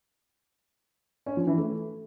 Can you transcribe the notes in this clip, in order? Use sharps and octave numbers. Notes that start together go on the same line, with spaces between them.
C#4
F3
E3
A3